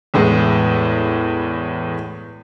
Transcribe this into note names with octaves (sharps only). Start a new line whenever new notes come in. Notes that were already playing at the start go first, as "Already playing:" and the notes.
E2 A2 G#3 B3